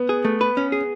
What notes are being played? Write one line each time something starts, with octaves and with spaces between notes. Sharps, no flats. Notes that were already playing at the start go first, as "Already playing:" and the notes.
Already playing: B3
G#4
A3
B4
C#4
G#4